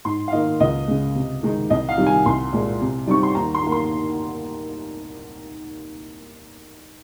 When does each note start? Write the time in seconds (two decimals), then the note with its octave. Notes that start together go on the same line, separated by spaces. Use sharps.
0.05 G#2 C6
0.28 F5
0.32 D#3 A#3 D#5
0.60 C#2 D#5
0.88 C#3 G#3
1.15 C3
1.43 D#3 G#3 D#4
1.70 C2 D#5
1.89 F5
1.98 C3 D#3 G3
2.07 G#5
2.26 C2 C6
2.53 A#2 G#3
2.81 C3
3.07 G3 C4 D#4 C#6
3.23 C6
3.35 D#2 A#5
3.54 C6
3.63 D#3 A#3
3.72 C6